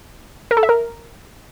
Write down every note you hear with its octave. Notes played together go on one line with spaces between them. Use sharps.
A#4
A4
E5
A#4